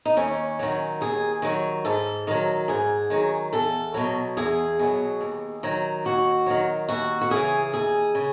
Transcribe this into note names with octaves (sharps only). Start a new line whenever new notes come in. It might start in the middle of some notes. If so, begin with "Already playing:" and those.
D#4
D#2 C#4
D#3 F#3
D#2 G#4
D#3 F#3
G#2 A4
D#3 F#3
G#2 G#4
D#3 F#3
E2 A4
B2 F#3
E2 G#4
B2 F#3
D#2
D#3 F#3
D#2 F#4
D#3 F#3
D#2 F#4
F#4
C#3 E3 G#4
D#2 G#4
C#3